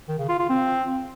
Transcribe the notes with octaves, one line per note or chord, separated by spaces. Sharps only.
D#3
C#3
F4
F4
C4